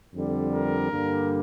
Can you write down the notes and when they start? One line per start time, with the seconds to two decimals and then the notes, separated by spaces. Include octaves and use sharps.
0.13 F2 D3 G3
0.52 A#4
0.90 G2 D3 G3 A#3